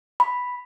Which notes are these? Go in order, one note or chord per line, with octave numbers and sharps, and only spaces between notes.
B5